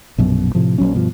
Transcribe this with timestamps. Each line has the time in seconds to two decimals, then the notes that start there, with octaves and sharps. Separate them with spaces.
0.18 A#1 F#2 B2
0.55 A2 C3 F3
0.78 A#1 F#3 C#4
0.95 G2 B2 F3